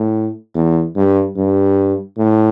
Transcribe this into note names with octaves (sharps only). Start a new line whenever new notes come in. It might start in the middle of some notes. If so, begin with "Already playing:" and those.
Already playing: A2
E2
G2
G2
A2